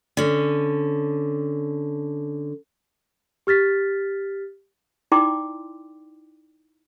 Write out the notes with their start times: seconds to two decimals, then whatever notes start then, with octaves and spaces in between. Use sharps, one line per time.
0.17 D3 C#4
3.47 G4 F6 A6 B6
5.12 D#4 E4 D5 G5 C6 D6